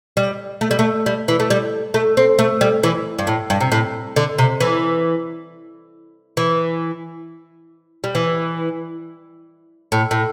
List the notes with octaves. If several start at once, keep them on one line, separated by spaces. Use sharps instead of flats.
G3
A3
G3
A3
G3
E3
A3
G3
A3
C4
A3
G3
E3
G2
A2
G2
C3
A2
D3
C3
E3
E3
G3
E3
A2
A2